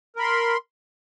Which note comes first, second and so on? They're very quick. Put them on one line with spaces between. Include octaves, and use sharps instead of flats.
A#4 B5 C6